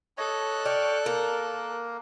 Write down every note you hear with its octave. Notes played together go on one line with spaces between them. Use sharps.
A4 C#5 D#5 F#6
D5 G5 C#6 F6
A#3 A#4